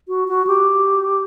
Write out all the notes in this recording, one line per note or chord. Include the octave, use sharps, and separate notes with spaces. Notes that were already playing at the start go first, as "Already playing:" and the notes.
F#4
F#4
G4